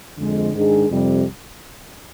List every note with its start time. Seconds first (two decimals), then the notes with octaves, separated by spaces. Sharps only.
0.17 F2 D3 G#3
0.53 G#2 D#3 G#3 D4 G#4
0.88 F2 C3 G3